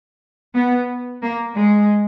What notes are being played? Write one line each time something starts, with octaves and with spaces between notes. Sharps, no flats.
B3
A#3
G#3